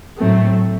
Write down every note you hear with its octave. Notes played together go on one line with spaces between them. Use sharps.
A2 F#3 A3 C4